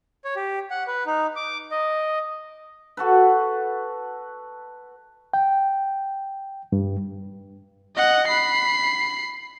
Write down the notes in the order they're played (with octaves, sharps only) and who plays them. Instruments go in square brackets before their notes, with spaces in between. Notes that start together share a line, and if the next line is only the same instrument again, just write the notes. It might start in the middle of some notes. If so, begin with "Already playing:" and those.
[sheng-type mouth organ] C#5
G4
F#5
B4
D#4
D6
D#5
[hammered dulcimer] F#4 A4 B4
[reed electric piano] G5
G2
[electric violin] D#5 F#5
B5 C7